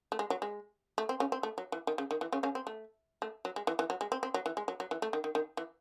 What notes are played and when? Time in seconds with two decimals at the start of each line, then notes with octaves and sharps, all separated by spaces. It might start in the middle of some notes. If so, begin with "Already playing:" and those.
0.12 A3
0.19 G#3
0.30 F#3
0.42 G#3
0.98 A3
1.09 C4
1.20 C#3 C#4
1.32 C4
1.43 A3
1.58 F#3
1.72 E3
1.87 D#3
1.98 C#3
2.11 D#3
2.21 E3
2.32 C#3 C#4
2.43 C#3 C#4
2.55 C4
2.67 A3
3.22 A3
3.45 F#3
3.56 G#3
3.67 E3
3.79 E3
3.90 F#3
4.01 G#3
4.12 C4
4.23 C4
4.34 F#3
4.46 E3
4.57 G#3
4.68 F#3
4.80 F#3
4.91 E3
5.02 A3
5.13 D#3
5.24 D#3
5.35 D#3
5.57 E3